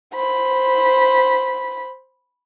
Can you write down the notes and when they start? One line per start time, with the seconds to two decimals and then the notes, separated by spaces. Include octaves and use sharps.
0.14 C5 B5